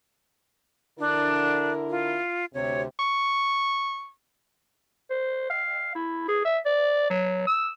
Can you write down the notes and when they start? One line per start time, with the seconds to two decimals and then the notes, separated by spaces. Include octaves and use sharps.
1.00 D3 D4 E4 A#4
1.90 F4
2.54 D2 C3 C#5
2.99 C#6
5.10 C5
5.50 F5
5.95 E4
6.28 G#4
6.45 E5
6.65 D5
7.10 F#3
7.47 E6